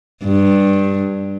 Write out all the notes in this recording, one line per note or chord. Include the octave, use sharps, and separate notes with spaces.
G2